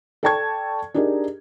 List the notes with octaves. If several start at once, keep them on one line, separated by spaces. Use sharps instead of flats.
A4 D5 G5 A5 C#6 G#6
D4 D#4 G4 G#4 A#4